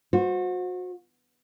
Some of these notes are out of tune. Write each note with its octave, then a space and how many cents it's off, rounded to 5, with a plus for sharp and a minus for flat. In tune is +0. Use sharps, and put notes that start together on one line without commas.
F#4 -30 C5 +0